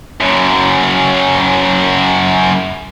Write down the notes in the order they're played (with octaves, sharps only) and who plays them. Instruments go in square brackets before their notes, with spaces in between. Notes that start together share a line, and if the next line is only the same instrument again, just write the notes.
[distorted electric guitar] F#2 C#3